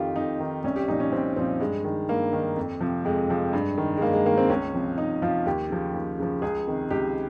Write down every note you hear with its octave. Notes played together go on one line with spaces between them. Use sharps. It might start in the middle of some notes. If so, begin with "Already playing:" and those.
Already playing: F2 D#3 F4 G4
F2 D#4
D#3
C2 C#4
G4
A#2 F3 D#4
C#4
C2 C4
A#2 F3 C4
G2 G#3
D#3
G2 A#3
D#3
F2
C3 F3
F2 G#3
C3 F3
G2
D#3
G#3
G2 A#3
G#3
D#3 A#3
C4
C#2 C#4
C3 F3
C#2 D#4
C3 F3 F4
D#2 G4
C#3 F3
D#2
C#3 F3
C#2 G#4
C3 D#3
C#2 G4